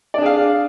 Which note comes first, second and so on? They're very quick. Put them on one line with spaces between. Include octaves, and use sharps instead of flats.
D5 D4 G#4 F5